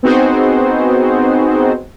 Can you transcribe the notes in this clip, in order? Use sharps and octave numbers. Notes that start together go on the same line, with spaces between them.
B3 C4 D#4 F#4 G#4 C5